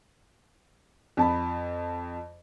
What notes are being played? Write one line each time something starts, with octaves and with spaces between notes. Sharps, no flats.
F2 A5 B5